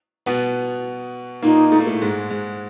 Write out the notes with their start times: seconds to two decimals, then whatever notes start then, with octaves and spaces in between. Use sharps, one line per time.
0.26 B2 B3
1.43 A#2 A#3 D#4
1.72 A3
1.80 A#3
1.87 A2 A3
2.02 G#2 G#3
2.30 G#2 G#3